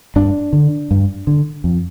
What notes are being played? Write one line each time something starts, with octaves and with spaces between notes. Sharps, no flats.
G2 D4
D3
G2
D3
F2